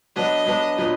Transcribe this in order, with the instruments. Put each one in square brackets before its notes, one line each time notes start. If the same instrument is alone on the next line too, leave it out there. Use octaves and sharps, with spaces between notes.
[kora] F#3 B3 D4 [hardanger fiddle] D#5
[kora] F#3 B3 D4
A#2 F#3 B3